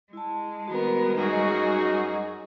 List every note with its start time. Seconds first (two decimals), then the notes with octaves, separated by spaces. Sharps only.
0.13 G#3 E4 A5
0.68 D#3 B3 F#4 A#4
1.16 F#2 G3 C#4 D#4 F#4 G#4 D#5 A#5